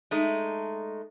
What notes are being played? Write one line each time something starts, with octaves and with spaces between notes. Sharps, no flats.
G#3 A3 D#4